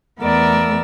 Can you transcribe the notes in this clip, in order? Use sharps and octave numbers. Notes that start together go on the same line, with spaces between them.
E2 A3 B3 A#4 D5 E6